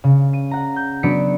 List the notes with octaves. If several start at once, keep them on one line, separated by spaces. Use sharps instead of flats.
C#3
D#7
F#5 A#5
G6
F#3 B3 D4 B6 C#7 D7